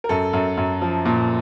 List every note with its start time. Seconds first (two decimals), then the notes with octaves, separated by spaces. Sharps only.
0.04 A#4
0.09 F#2 A4
0.33 F#2
0.57 F#2
0.82 F3
1.05 A#2